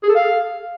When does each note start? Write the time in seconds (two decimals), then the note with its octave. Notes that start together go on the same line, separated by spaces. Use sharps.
0.03 G#4
0.09 A4
0.15 F5